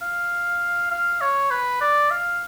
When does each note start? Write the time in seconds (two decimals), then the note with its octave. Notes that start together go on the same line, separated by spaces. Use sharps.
0.02 F5
0.91 F5
1.21 C#5
1.51 B4
1.81 D5
2.11 F5